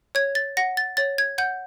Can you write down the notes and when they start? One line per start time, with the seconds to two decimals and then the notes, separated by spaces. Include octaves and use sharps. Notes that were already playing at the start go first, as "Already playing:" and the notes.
0.15 C#5 G#6
0.35 A6
0.57 F#5 A#6
0.77 A6
0.97 C#5 A6
1.18 G#6
1.38 F#5 G6